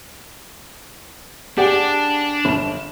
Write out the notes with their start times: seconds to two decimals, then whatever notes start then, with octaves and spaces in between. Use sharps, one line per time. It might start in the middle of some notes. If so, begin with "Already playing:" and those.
1.57 D4 G4 G#4 F#5
2.45 G1 E7